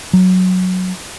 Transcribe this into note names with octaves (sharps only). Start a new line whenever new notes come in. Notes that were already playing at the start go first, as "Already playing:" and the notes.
F#3